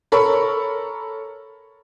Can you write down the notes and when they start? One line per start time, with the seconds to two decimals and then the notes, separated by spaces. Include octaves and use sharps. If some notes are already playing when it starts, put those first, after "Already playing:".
0.12 A4 A#4 C#5 B5 C#6